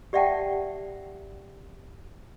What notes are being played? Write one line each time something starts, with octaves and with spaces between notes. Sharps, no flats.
G4 D5 E5 F#5 G5 A5